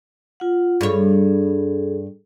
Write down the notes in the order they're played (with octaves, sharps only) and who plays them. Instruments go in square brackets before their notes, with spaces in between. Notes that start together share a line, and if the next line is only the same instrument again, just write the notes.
[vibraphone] F4 F#5
[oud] G2 C#5 [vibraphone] G#4 A4